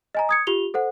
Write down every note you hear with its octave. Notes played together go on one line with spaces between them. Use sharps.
D#5 G#5 A#5
D#6 G#6 C#7
F4 G4 F7 G7
A4 C5 F#5